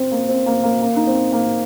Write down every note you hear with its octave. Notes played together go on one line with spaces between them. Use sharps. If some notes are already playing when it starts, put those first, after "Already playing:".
Already playing: C4
A#3
C4
A#3
A#3
A#3
D#4
C4
A#3